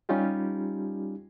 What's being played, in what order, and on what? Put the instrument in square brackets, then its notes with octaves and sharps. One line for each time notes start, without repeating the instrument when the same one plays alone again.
[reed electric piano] G3 C#4 D#4 F4 G4